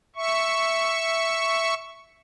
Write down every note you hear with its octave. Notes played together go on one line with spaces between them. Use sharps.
E5 C#6